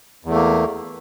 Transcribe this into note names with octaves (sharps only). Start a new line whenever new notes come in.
E2 A3 A#3